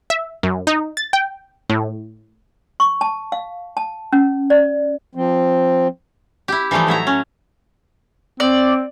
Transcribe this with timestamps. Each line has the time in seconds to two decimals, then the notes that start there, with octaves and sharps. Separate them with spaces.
0.10 E5
0.43 F#2
0.67 D#4
0.97 A6
1.13 G5
1.70 A2
2.80 C#6
3.01 A5
3.32 F5
3.77 A5
4.13 C#4
4.50 D5
5.15 F3 C4
6.48 E4 G4
6.71 E3 F3 G3 A3 D#4
6.87 A2 F#3 E5 A#5
7.07 C#4
8.40 C4 D5